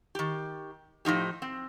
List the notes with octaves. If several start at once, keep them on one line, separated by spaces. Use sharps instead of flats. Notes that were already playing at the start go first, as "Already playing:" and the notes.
D#3 G4
A2 F3 D#4 G4
C4